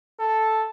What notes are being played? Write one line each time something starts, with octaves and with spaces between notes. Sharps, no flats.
A4